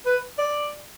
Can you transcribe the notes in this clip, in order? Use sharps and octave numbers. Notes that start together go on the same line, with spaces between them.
B4
D5